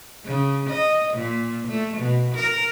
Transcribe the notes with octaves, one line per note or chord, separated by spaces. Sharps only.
C#3
D#5
A#2
A3
B2
A#4